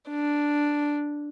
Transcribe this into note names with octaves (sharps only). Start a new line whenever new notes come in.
D4